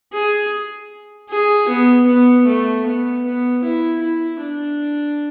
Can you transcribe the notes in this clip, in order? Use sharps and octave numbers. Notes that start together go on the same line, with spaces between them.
G#4
G#4
B3
B3
A3
B3
B3
E4
E4
D4